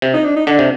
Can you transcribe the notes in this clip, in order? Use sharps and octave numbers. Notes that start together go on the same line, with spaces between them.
C3
D#4
D4
D#4
D3 D4
C3